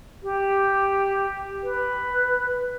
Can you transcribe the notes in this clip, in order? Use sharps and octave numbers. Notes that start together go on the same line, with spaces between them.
G4
B4